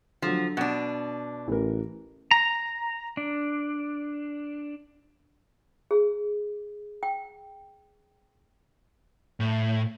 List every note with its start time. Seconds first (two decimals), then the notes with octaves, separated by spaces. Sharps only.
0.22 D3 F3 F#3
0.57 B2 D4 F#5
1.48 A1 E3 A#4
2.31 A#5
3.17 D4
5.91 G#4
7.03 G5
9.40 A2